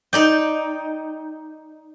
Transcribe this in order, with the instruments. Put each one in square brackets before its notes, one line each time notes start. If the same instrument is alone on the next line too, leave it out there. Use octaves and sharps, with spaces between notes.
[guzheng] D#4 D5 G5